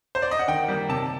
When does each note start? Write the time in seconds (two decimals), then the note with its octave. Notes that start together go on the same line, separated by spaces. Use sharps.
0.15 C5
0.22 D5
0.31 D#5
0.39 F#5
0.48 D#3 G5
0.68 G3 A#3
0.89 C3 A5